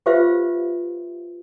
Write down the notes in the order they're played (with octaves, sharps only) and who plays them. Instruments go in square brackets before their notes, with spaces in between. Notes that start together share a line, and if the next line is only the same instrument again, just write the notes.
[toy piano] F4 G4 B4 C5 E5 F5